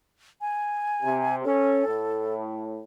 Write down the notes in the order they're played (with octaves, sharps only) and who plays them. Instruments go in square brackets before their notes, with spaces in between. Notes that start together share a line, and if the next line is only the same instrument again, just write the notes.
[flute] G#5
[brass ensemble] C3
[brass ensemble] C#4 [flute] A4
[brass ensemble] A2